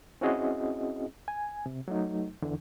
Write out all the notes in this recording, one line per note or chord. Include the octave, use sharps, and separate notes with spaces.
C4 C#4 E4 F#4 G#4 D#5
G#5
C3
F#3 A3 D#4
E2 D3 E3